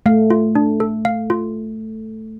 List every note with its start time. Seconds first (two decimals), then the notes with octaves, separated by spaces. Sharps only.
0.06 A3 F5
0.30 F4
0.55 D4
0.80 A4
1.05 F5
1.30 F4